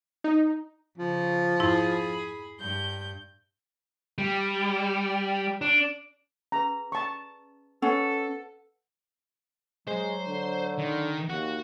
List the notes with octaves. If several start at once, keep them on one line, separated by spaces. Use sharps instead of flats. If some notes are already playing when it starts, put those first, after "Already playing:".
D#4
C#3 F3
F2 G#2 E4 G#4 B5
G2 G6
G3
D4
C#4 G#4 B4 A#5
A5 C#6
C#4 A4 B4 C5 F#5
F#3 G#3 C5
D3
D#3
D#2 F#4